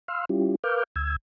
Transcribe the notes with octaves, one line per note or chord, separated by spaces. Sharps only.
F5 C6 E6 F6
G3 C#4 E4 F4 G4
A#4 B4 F5 D6 F6 G6
D2 E6 G#6